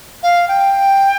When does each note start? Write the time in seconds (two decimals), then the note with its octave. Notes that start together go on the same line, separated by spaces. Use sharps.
0.23 F5
0.48 G5